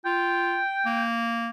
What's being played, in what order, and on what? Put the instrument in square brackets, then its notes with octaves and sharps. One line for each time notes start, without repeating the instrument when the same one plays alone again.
[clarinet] F4 [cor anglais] G5
[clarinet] A#3